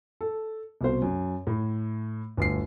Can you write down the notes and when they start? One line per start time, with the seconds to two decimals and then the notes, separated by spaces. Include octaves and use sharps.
0.21 A4
0.81 C2 B2 C5
1.02 F#2
1.47 A2
2.37 G1 D2 C7